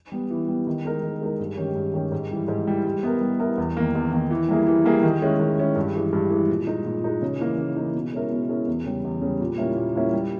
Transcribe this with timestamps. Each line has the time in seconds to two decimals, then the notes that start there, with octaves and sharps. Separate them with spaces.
0.12 G3 B3
0.30 E3
0.48 G3 B3
0.67 D#3
0.85 G#3 D#4 A#4
1.03 D#3
1.21 G#3 D#4 A#4
1.40 G2
1.57 D#3 G#3 C#4 G4
1.76 G2
1.94 D#3 G#3 C#4 G4
2.12 G#2
2.31 E3 G3
2.48 G#2
2.67 E3 G3
2.85 G3
3.03 B3 E4 A#4
3.21 G3
3.40 B3 E4 A#4
3.58 E2
3.77 D#3 A#3
3.95 E2
4.12 D#3 A#3
4.31 E3
4.48 G3 A#3 E4 G#4
4.67 E3
4.85 G3 A#3 E4 G#4
5.03 D#3
5.22 G#3 C#4 E4
5.39 D#3
5.58 G#3 C#4 E4
5.76 G2
5.95 E3 G#3
6.13 G2
6.30 E3 G#3
6.49 A#2
6.67 G#3 D#4
6.85 A#2
7.04 G#3 D#4
7.22 C#3
7.40 E3 A#3 D#4
7.58 C#3
7.77 E3 A#3 D#4
7.94 B2
8.13 G#3 C#4 E4 A#4
8.30 B2
8.49 G#3 C#4 E4 A#4
8.67 E2
8.86 C#3 G3
9.04 E2
9.22 C#3 G3
9.41 A#2
9.58 G3 A#3 C#4 E4
9.76 A#2
9.95 G3 A#3 C#4 E4
10.13 G3